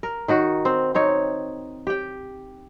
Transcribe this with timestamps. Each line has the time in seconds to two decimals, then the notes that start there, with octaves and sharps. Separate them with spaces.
0.03 A#4
0.28 D#3 D#4 F#4
0.65 C4
0.95 C4 D#4 C#5
1.87 G4 G5